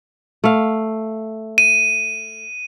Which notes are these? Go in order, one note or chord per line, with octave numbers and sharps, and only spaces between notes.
A3 F5
D#7